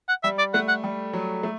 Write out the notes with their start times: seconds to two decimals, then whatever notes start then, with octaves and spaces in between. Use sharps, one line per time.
0.09 F#5
0.24 G3 E5
0.39 D5
0.54 A3 F#5
0.68 F#5
0.84 G3
1.13 F#3
1.43 A3